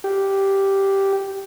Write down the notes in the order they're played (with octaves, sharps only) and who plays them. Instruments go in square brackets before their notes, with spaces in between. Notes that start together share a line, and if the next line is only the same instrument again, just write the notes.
[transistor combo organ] G4